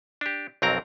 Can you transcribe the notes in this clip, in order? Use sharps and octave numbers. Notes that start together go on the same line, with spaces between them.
D4 G4
B1 F2 F#3 C4 A#4 A#5